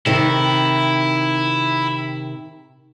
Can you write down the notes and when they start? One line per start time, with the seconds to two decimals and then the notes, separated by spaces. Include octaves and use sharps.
0.06 C3 D#3 E4